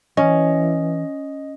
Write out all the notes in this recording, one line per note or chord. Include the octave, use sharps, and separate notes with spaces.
E3 C#4 D#5